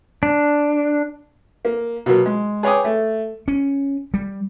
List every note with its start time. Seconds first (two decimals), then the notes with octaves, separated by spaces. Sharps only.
0.23 D4
1.65 A#3
2.06 B2 F#3 A#3
2.26 G#3
2.63 G#4 B4 C#5 G5 D6 D#6
2.84 A3
3.48 C#4
4.14 G3